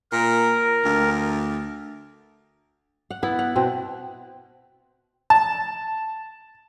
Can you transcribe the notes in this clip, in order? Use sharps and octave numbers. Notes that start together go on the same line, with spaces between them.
A#2 A#4
D2
F#5
B3 E4
F#5
B2 C4
A5